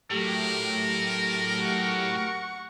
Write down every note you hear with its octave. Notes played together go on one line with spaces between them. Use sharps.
A2 F#3 A3 G4 A#4
F#5 C#6